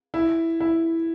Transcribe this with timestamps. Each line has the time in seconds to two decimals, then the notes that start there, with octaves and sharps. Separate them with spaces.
0.14 E4
0.60 E4